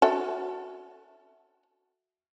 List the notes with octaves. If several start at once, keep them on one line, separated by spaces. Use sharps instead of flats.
F#4 A4 E5